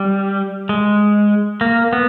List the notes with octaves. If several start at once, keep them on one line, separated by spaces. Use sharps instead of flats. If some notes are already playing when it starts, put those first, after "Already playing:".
Already playing: G3
G#3
A#3
B3